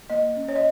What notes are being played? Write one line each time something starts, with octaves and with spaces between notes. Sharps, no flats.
A#3 D#5
C#4
C#5
D#5